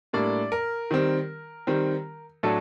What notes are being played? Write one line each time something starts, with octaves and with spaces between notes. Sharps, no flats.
A2 G3 A#3 D4 D5
A#4
D#3 G3 C4
D#3 G3 C4
A2 F#3 A3 D4 A4